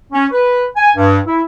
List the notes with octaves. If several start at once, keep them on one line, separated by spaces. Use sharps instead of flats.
C#4
B4
G#5
G2
E4